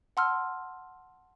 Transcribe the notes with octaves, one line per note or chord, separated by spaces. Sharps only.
F#5 A5 C6 E6 F6